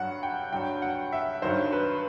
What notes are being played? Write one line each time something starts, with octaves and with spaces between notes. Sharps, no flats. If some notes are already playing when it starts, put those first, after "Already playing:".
Already playing: G2 F#3 F#5
G5
G2 F#3 G5
F#5
E5
G2 D#3 F#3 C5
B4